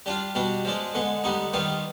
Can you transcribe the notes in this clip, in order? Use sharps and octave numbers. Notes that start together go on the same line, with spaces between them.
G3 D4 F4
B2 G3 D4
F3 G#3 D4
D3 G#3 B3
D3 G3 B3 D#4
D#3 G3 B3 F4